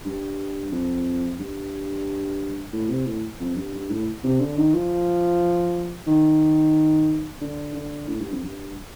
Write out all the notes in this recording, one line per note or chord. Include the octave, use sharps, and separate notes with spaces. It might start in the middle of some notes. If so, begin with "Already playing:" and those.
G2
F2
G2
A2
C3
A2
F2
G2
G2
A2
C3
D3
D#3
F3
D#3
D3
D3
A2
G2
F2
G2